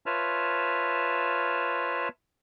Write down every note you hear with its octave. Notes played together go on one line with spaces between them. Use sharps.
F4 B4 C#5 E5 A5 F6